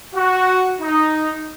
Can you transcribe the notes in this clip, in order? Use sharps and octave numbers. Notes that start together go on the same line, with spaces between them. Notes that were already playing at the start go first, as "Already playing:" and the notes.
F#4
D#4